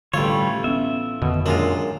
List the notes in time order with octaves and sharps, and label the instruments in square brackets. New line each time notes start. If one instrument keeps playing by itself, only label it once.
[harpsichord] A1 F4 [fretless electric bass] D3 [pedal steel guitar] G3 A3 C#5
[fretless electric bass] B3 C#4 [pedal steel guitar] E5
[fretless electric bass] F2 D3 D#3 [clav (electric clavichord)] B2
[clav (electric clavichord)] F#2 G#3 F4 [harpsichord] A#2 D4